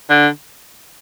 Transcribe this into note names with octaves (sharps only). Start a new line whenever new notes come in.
D3